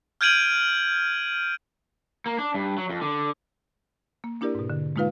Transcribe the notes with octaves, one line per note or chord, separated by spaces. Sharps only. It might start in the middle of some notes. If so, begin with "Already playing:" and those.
F6 G6 G#6 D7 D#7 F#7
A#3
D4
G2
F#3
F2
D3
A#3
A#3 D4 E4 G4 A#4 D5
G#2 B2
D3
G#3 A#3 D#4 F4 B4 F5